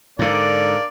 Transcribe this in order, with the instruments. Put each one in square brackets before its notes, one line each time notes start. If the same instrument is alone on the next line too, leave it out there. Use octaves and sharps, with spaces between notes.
[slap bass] G#2 D3 [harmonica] A#3 D4 D5